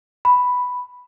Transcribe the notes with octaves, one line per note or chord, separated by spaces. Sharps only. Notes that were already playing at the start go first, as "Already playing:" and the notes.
B5